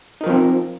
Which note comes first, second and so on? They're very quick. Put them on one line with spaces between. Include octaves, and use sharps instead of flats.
D#4 A#4 F3 C4